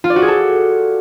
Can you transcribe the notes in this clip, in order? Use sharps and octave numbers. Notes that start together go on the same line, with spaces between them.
F4
D5
F#4
G#4
A4